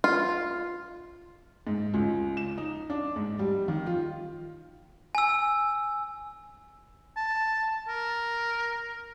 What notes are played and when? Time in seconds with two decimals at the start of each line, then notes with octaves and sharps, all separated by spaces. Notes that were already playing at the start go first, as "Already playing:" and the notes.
0.04 F4
1.67 G#2
1.94 C#2
2.37 E7
2.58 D#4
2.90 D4
3.16 G#2
3.39 G3
3.68 D#3
3.86 F4
5.15 G#5 E6
7.17 A5
7.88 A#4